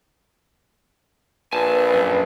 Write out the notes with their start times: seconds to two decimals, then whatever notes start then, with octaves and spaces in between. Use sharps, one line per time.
1.53 A#1 B4 G#5 A5
1.94 F#2